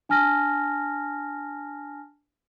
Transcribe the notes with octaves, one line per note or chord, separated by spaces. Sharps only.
D4 G#5 A5 F6 A#6